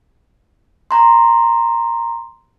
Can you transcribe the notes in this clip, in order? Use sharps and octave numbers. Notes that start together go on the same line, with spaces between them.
A#5 C6